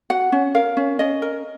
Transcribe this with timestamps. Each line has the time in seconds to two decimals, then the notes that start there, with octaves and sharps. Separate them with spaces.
0.10 F#4 F#5
0.32 C#4
0.55 A#4 F5
0.77 C#4
0.99 C#4 D#5
1.22 A#4